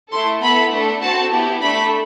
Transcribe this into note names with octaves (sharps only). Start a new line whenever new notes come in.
A3 E4 A4 C6
B3 E4 A4 B5
A3 D4 A4
C4 F#4 A4 A5
B3 E4 G4
A3 D4 A4 B5